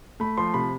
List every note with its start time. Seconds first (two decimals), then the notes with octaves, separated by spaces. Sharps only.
0.20 A3 B5
0.37 F3 C6
0.54 C3 B5